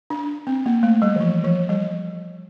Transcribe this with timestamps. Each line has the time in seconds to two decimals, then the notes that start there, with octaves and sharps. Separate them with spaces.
0.10 D4
0.47 C4
0.66 A#3
0.83 A3
1.02 G3
1.16 E3
1.21 F3
1.44 F3
1.69 G3